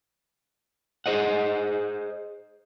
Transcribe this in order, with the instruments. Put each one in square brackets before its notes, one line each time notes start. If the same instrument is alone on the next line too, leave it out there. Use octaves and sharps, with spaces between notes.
[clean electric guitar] G#4 C5 D#5 F#5